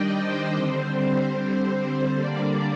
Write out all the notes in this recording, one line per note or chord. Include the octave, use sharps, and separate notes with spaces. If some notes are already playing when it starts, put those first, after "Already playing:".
Already playing: D#3 G3 D4 D5 D#5 G5
C5
D3 G3 C4 C5
D3 G3 A#3 D4 D5